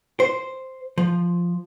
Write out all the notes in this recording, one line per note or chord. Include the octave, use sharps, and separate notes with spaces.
C5
F3